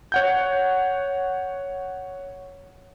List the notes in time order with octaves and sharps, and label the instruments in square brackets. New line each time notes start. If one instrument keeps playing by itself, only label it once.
[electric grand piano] C#5 F#5 G6